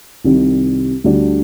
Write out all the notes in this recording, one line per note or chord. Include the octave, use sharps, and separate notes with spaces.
C2 C3 D#3 G3
D2 D3 G3 D4